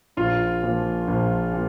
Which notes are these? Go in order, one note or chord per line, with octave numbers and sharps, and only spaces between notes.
A#1 F4
A#2 F3
A#1
A#2